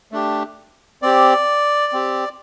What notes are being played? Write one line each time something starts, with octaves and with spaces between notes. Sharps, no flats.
A3 D4 G4
C4 G4 D5
C4 G4